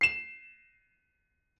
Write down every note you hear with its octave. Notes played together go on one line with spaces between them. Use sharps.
C7 E7